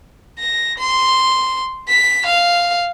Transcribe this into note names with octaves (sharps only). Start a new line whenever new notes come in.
A#6
C6
B6
F5